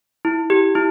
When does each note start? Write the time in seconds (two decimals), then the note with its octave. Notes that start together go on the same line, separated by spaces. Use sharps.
0.25 E4
0.50 G4
0.75 E4